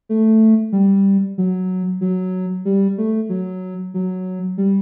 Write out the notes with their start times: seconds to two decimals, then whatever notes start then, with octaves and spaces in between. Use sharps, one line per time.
0.09 A3
0.72 G3
1.38 F#3
2.01 F#3
2.65 G3
2.98 A3
3.29 F#3
3.94 F#3
4.58 G3